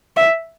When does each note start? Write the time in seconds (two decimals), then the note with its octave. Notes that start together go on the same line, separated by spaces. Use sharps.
0.17 E5